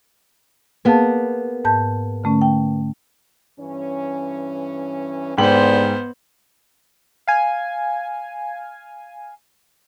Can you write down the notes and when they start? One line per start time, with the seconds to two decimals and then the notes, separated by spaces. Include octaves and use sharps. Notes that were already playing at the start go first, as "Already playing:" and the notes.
0.85 A#3 B3 G#4 F5 A5
1.65 G#2 A5 G6
2.24 D3 A3 C#4
2.41 G5
3.60 G2 E3 C#4
5.38 D#2 G#2 D3 B3 C5 D5 G5 F#7
7.27 F5 G#5